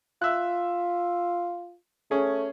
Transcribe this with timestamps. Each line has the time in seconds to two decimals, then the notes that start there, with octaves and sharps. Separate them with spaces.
0.22 F4 E5 F#6
2.11 A3 C#4 G#4